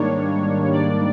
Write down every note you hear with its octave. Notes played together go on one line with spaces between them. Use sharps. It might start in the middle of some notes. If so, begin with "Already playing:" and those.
Already playing: G#2 D#3 G3 A#3 D4 C#5
D5